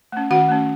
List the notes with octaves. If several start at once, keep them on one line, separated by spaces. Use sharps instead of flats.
A3 C#4
D#3 F#4 F#5
A3 C#4